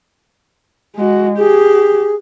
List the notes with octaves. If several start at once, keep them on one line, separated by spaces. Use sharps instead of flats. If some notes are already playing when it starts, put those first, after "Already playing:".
G#3 F#4
G4 G#4